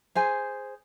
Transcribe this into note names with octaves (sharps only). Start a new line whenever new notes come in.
G#4 C5 G#5